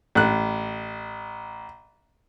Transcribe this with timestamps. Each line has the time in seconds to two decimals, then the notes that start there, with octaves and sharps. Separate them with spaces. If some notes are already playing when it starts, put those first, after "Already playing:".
0.15 A1 F#6